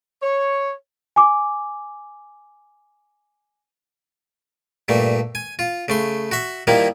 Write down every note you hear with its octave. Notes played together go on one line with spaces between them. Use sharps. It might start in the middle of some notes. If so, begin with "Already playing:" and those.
C#5
G#5 D6
G2 A#2 A3
G#5
F4
C#3 A3 C6
F#4 E5
D#3 F3 G3 A#3 E4